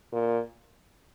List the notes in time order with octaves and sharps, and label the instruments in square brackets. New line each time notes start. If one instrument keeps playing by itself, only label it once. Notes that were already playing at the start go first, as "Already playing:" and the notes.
[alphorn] A#2